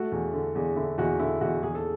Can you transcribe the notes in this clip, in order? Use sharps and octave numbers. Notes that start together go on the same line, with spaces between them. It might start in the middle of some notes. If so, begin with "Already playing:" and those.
Already playing: A3 F#4
E2
D3
E2
D3 E4
E2 F#4
D3 E4
E2 F#4
E2 G#4
A4